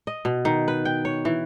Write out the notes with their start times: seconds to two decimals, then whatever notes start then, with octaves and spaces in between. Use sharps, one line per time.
0.07 D#5
0.25 B2
0.45 D#3
0.68 B4
0.85 G5
1.05 C#5
1.25 E3